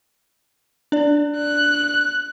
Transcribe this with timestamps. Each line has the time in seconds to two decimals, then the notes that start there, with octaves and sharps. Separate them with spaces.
0.92 D4 D5
1.36 F#6